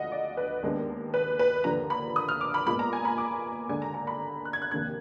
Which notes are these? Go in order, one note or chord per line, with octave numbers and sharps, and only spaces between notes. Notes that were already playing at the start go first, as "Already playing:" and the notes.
Already playing: D2 D3 F3 G#3 D#5 F5 F#5
D5
B4
D#2 D#3 G#3 B3 D4
B4
B4
D#2 D3 F3 A#5
B5
D#6
F6
D6
B5
A#2 G#3 B3 F4 B5
A#5
G#5
B5
D6
D#2 D3 G#3 G#5
A#5
A#5
B5
F#6
G#6
F#6
F1 D#2 D#3 A#3 D4 G#6